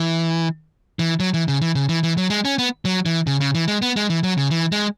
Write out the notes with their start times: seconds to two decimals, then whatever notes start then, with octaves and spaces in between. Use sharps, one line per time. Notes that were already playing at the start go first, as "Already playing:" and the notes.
Already playing: E3
0.99 E3
1.20 F#3
1.34 E3
1.48 C#3
1.62 E3
1.75 C#3
1.89 E3
2.03 E3
2.17 F#3
2.30 G#3
2.45 C#4
2.58 B3
2.85 F#3
3.06 E3
3.27 C#3
3.40 C#3
3.55 E3
3.68 G#3
3.82 B3
3.96 G#3
4.09 E3
4.23 F#3
4.38 C#3
4.51 E3
4.72 G#3